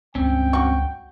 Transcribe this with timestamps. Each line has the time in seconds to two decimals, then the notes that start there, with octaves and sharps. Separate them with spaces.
0.15 C#2 G2 C4 C#4 G5
0.53 F#4 C#6